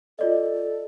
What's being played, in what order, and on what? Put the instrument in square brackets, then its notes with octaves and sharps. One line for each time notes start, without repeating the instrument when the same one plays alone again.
[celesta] F4 D5 D#5 [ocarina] A4